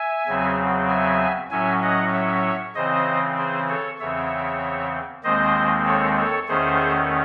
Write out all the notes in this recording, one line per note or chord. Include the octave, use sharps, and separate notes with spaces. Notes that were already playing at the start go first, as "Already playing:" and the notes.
Already playing: E5 G#5
E2 C#3 F#3 C4
E5 G#5
A2 F#3 C#4 E5 G#5
D#5 F#5
C#5 E5
C#3 E3 C4 C5 D#5
G#4 C5
A4 C#5
E2 C#3 E3 C4 C#5 E5
D#2 D#3 G#3 C4 C5 D#5
A4 C#5
A4 C#5
E2 D#3 A3 C#4 G#4 C5